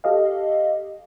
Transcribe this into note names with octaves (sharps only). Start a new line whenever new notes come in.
G4 A4 D#5 F5